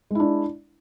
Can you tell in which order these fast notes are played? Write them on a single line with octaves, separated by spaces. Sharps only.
G#3 E4 D4